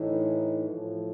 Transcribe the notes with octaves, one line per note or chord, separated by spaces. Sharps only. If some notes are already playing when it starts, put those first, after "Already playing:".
Already playing: A2 E3 D#4
A2 F3